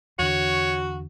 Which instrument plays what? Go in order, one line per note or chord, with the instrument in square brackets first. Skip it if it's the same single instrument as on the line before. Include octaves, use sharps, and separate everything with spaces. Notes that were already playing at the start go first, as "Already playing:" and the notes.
[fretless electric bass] E2 D3 [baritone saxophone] F#4 [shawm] C#5